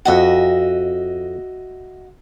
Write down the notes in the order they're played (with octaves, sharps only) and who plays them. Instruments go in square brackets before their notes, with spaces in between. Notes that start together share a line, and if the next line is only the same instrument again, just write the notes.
[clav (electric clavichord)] F2 F#5 [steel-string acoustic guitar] F#4 D#5 E5